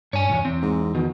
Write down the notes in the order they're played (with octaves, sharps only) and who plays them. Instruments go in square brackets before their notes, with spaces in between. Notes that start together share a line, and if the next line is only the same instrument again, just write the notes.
[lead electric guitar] G2 [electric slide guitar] C#5 G#5
[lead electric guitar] B1 E2
[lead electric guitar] E2 [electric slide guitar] C4
[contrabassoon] G#2
[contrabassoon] B2 [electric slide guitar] D#3